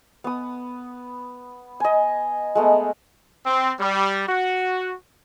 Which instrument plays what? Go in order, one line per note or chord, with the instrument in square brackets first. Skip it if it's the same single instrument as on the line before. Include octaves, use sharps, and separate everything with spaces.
[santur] B3 D#6
D#5 G#5
G#3 A3 B3
[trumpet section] C4
G3
F#4